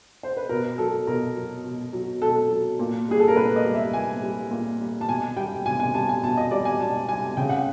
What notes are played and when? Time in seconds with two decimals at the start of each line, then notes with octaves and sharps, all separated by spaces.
0.23 C5
0.37 B4
0.49 B2 A#4
0.78 F#3 A4
1.07 B2 A#4
1.36 F#3
1.64 B2
1.93 F#3
2.22 B2 A4
2.50 F#3
2.79 A#2
3.08 G3 G#4
3.19 A4
3.28 A#4
3.36 A#2 B4
3.56 D#5
3.65 G3
3.74 E5
3.93 A#2 G#5
4.22 G3
4.51 A#2
4.80 G3
5.01 A5
5.08 B2 G#5
5.37 G3 G5
5.66 B2 G#5
5.80 G#5
5.94 G3 A5
6.09 G#5
6.23 B2 A5
6.37 D#5
6.51 G3 D5
6.65 G#5
6.80 B2 A5
7.08 G3 G#5
7.37 C#3 G5
7.49 F#5